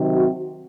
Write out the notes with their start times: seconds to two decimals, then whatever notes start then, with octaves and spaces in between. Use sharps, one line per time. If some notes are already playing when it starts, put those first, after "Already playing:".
Already playing: C3 D#3 F#3 C4
0.14 F#4